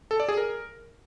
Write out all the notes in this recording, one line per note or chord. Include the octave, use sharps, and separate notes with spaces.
A4
D5
G#4
A#4